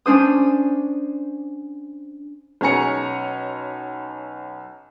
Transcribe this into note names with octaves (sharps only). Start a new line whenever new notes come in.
C#4 D4 C5 D#6
B1 C#4 C#5 G#5 A#5 C#7